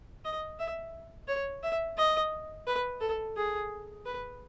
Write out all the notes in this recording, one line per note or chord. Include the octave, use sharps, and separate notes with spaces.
D#5
E5
C#5
E5
D#5
B4
A4
G#4
B4